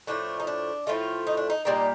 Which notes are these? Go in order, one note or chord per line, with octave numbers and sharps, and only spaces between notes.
A2 F3 A3 D4
D#4
D4
A2 F3 A3 F4
D#4
D4
D#4
A#2 G3 A#3 D#4